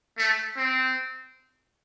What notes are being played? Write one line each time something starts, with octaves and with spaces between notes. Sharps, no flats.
A3
C4